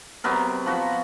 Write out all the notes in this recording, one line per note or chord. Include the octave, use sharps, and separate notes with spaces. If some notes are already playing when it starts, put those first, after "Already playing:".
C3 F#3 B3 A#4
F3 F#4 B5